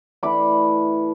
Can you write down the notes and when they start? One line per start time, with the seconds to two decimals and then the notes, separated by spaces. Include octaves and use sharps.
0.23 E3 A3 D4 B5 D6